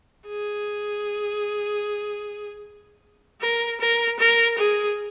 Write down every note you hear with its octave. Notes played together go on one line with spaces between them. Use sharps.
G#4
A#4
A#4
A#4
G#4